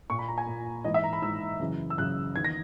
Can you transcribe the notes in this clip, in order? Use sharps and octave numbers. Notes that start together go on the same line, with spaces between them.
A#2 C#6
B5
A#5
G#5
A#2
G#2 E3 D#5
E5
A#5
B5
G#2 E3 E6
F#2 C#3 E3
E6
F#2 C#3 E3 F#6
E2 D#3 G#6
A#6